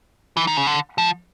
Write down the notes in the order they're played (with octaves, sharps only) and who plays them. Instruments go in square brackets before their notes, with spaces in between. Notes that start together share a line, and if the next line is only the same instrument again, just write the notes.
[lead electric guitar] E3
D#3
C#3
D3
F3